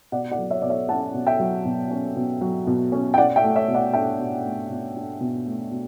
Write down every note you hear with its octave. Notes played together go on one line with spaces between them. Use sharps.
B2 D5 F#5
D5 F#5
F#3
C#5 E5
B2 D5
C#5 E5
C#4 F#5 A5
B2
E5 G5
F#3
B2
C#4
B2
F#3
B2
C#4
G5
B2 D5 F#5
E5 G5
A3
C#5 E5
B2
D5 F#5
D4 E5 G5
B2
A3
B2
D4
B2
A3
B2